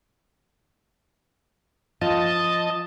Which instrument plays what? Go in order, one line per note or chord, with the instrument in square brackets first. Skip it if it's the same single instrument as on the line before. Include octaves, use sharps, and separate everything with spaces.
[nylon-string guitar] F3 F4 [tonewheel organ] D#5 A5